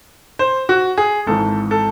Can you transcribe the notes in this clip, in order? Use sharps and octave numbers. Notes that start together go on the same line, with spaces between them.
C5
F#4
G#4
G#1 G#2 E3 A4
A4